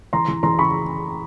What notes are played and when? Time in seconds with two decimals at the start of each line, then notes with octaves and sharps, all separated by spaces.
0.13 E3 A#5 C6
0.28 E3
0.43 E3 A#5 C6
0.58 C#3 B5 C#6